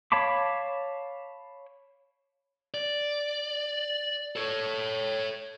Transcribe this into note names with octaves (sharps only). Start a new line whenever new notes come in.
C#5 F5 A5 B5 D6
D5
A4 C#5